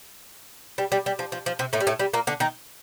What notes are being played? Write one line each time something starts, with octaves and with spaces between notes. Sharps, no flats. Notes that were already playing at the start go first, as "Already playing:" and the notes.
G3
G3
G3
F3
F3
F3
C3 C4
A2 A3
G3
A2 A3
G3
A#2 A#3
D3 D4
D#3 D#4